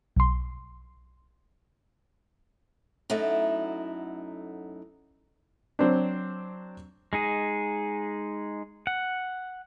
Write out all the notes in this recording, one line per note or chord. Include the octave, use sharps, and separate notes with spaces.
B1 C6
F#2 F#3 A3 D#4 E4
F#3 C4 D4
G#3 D#4 G#4
F#5